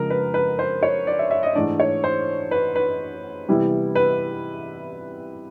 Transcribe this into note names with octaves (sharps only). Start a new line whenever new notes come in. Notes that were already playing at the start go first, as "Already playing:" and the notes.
Already playing: C#3 F3 G#3 A#4
B4
B4
C5
C#5
D5
E5
E5
D#5
G#2 E3 A3 D4 D5
C#5
C5
B4
B4
C3 E3 G3 B3 E4
B4